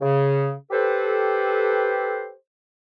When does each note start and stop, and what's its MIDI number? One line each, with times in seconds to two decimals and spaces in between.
0.01 0.52 49
0.71 2.30 67
0.71 2.30 69
0.71 2.30 71
0.71 2.30 72